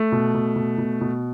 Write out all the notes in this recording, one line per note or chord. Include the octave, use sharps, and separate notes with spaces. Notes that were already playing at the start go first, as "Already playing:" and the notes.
Already playing: A3
B2
B2
B2
B2
B2